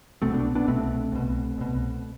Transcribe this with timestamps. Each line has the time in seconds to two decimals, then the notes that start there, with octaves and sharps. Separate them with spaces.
0.22 C2 B2 A3 C4
0.33 B3 D4
0.55 B3 D4
0.67 C2 B2 A3 C4
1.12 C2 B2
1.58 C2 B2